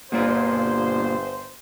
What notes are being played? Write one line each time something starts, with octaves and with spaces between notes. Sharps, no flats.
G1 B2 A#3 C5 D5